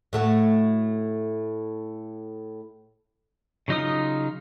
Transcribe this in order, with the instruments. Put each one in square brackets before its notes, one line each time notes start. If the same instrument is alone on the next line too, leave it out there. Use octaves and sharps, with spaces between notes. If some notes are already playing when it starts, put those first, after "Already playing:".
[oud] A2 A3 F#4
[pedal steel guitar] C#3 F#3 D#4 F4 D#6